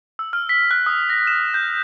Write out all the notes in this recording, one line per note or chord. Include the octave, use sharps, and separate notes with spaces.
E6
F6
B6
F#6
D#6
A#6
E7
G6